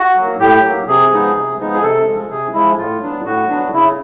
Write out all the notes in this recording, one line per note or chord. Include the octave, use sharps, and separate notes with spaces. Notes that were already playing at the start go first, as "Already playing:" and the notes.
Already playing: F#4
F#3 A#3
A2 G4
F#3 A#3
C3 G#4
F3 G#3 B3 D#4
C3
F3 G#3 B3 D#4
G#4
C3 A4
F3 G#3
C3 G#4
F3 G#3 E4
A2 F4
F#3 B3 D4
A2 F#4
F#3 B3 D4
C#3 E4